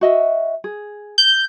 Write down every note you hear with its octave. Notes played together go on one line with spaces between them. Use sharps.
F#4 D#5 E5
G#4
G6